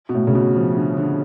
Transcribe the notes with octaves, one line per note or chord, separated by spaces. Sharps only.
B2
A2
C#3
B2
F3
D3
D3